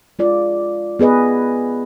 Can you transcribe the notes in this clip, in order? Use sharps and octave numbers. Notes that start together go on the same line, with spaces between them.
G#3 F4 D5
B3 G#4 B4 D#5